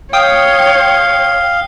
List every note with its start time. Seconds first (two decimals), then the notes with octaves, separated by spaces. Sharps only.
0.13 C#5 F5 G5 D#6